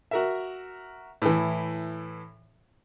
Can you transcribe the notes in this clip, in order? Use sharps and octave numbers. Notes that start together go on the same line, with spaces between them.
F#4 A#4 E5
A2 E3